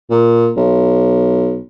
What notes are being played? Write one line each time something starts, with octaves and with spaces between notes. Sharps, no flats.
A#2
B1